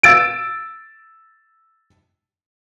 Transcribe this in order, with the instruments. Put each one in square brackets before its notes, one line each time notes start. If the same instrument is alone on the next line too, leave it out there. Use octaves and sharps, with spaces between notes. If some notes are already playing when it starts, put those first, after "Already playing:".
[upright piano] E6 A6 D7